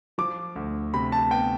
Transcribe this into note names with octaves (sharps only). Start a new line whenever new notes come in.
F3 D6
D2
C3 B5
A5
B3 G5